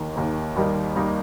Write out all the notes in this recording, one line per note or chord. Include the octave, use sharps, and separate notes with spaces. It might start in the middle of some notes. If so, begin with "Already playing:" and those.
Already playing: D#2 D#3 A#3
D#2 D#3 A#3
D#2 D#3 G3 A#3 D#4
D#2 D#3 G3 A#3 D#4